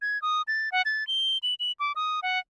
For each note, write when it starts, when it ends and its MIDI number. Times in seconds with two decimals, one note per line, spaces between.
0.02 0.21 92
0.22 0.42 87
0.48 0.69 93
0.72 0.82 78
0.85 1.06 93
1.07 1.38 103
1.43 1.54 102
1.60 1.72 102
1.80 1.92 86
1.96 2.20 87
2.23 2.39 78